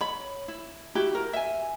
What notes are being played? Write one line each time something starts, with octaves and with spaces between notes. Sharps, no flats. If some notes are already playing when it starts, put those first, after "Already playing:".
C#5 B5
E4
E4 F#4 G4
A#4
E5 G#5